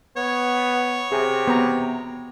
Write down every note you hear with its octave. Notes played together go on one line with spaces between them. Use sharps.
B3 C#5
C3 G#4
B3 A#5